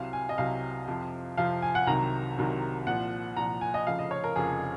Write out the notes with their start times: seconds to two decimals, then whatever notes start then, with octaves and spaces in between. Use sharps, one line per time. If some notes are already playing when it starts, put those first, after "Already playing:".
Already playing: C2 C3 F#3 F5
0.13 G#5
0.29 D#5
0.38 C2 C3 F#3 F5
0.88 F2 C3 F3
1.37 F2 C3 F3 F5
1.62 G#5
1.75 F#5
1.87 C2 C3 D#3 F#3 A#5
2.37 C2 C3 D#3 F#3
2.87 C2 A#2 F3 F#5
3.36 C2 A#2 F3 A#5
3.61 G#5
3.74 D#5
3.86 F1 F2 C#3 F3 F5
3.99 D#5
4.11 C#5
4.24 A#4
4.36 F1 F2 C#3 F3 G#4